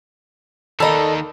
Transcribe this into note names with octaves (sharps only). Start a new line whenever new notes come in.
D#3 A#3 A4 D#5 A#5 B5 E6